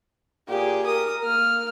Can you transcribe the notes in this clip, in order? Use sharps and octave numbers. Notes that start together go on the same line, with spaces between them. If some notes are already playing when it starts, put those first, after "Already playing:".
A#2 G4 G#4
A#4 D#6
A#3 F6